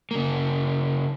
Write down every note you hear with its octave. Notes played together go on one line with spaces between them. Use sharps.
C#3 A#3